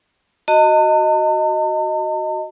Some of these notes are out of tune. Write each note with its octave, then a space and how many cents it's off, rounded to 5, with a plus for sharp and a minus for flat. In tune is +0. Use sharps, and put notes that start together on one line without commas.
F#4 +0 D#5 +0 A5 +45